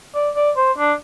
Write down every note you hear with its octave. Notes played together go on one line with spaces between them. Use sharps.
D5
D5
C5
D4